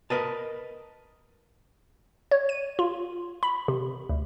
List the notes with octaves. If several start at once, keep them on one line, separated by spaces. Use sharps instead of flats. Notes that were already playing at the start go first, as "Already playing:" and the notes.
A#4 B4 D#5 A5
C#5
D#7
F4
B5
C3
D2